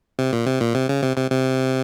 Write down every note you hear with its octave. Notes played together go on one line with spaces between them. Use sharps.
C3
A#2
C3
A#2
C3
C#3
C3
C3
C3